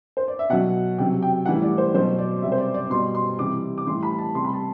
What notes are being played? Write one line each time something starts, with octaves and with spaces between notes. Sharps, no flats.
C5
D5
E5
B2 F#3 F#5
C3 F#3 G5
G5
A2 E3 G3 F#5
D5
C5
B2 F#3 C5
D5
C3 G3 E5
C5
D5
D5
B2 G3 C6
C6
C3 E3 G3 D6
D6
A2 E3 G3 C6
B5
A5
C3 G3 C6
B5
A5